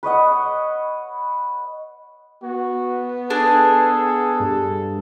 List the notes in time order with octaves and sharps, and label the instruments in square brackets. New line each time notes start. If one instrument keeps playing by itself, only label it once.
[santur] B4 C#5 D#5 F#5
[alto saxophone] B3 [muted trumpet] F#4
[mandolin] D4 [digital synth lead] G#4 [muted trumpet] A4
[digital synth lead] G2